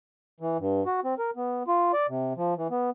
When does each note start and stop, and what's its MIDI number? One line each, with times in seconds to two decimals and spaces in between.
0.40 0.57 52
0.59 0.84 43
0.86 1.00 66
1.04 1.15 60
1.19 1.31 70
1.36 1.63 59
1.68 1.92 65
1.93 2.07 74
2.09 2.33 48
2.37 2.54 53
2.58 2.67 52
2.71 2.90 59